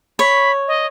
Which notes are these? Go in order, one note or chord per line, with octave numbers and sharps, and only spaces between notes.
C#5 B5
D#5